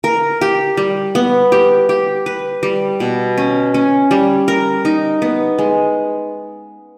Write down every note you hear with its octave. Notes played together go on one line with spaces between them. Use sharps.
A#4
G4
G3
B3
G4
G4
B4
G3
B2
C#4
C#4
G3
A#4
D#4
B3
G#3